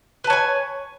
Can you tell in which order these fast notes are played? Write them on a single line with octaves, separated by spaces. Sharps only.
B4 A5 C#5 G#5